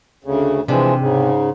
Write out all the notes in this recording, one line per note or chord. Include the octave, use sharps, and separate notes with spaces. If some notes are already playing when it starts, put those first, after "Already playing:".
D2 C#3
C3 E3 F3 G#3 D4
G#2 C#3